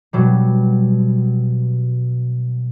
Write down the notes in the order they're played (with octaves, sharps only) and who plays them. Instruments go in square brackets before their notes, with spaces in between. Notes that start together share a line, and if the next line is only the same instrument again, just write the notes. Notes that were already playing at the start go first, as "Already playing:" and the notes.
[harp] B2 F#3 G3